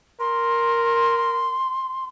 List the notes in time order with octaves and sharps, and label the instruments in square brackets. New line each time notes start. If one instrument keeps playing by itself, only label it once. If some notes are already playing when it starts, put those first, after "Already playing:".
[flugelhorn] A#4 [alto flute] C6